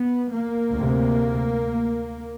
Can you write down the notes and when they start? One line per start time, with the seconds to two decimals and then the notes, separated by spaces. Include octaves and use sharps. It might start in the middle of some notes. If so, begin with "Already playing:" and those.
Already playing: B3
0.31 A#3
0.75 D2 C3